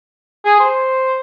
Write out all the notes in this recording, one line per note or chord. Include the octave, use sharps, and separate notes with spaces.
G#4
C5